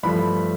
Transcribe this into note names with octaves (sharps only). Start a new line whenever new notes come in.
G2 F3 A3 B5